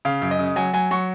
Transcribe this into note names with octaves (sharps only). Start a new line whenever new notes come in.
C#3 F5
F#2
D#5
C#3
F#3 G#5
F#3 G#5
F#3 C#6